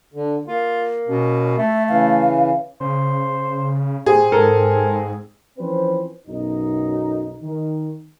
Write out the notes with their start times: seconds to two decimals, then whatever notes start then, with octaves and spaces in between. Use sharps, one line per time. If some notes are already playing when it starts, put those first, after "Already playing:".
0.14 D3
0.47 A#3 F4
1.08 B2 C#4
1.58 A3 E5
1.89 C#3 E3 F5
2.81 C#3 C5
4.06 A2 C4 G#4
4.32 G#2 A4 A#4
5.59 E3 F3 C4 C#4 B4 C5
6.27 B1 F#2 D#4
7.42 D#3